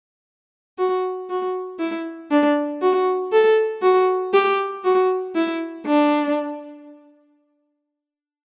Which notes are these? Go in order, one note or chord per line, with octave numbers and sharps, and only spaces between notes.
F#4
F#4
E4
D4
F#4
A4
F#4
G4
F#4
E4
D4